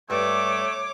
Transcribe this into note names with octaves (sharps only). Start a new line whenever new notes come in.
G2 A3 C#5 D6